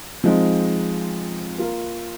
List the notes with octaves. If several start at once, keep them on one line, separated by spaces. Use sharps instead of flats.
F3 G#3 C4 D#4
A#3 F4 A#4